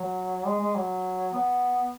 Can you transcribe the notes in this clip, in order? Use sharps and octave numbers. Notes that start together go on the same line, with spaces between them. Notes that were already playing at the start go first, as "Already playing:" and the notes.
Already playing: F#3
G#3
G#3
F#3
B3